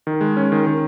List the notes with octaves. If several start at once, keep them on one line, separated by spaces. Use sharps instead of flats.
D#3
G#3
C#4
D#3
D#3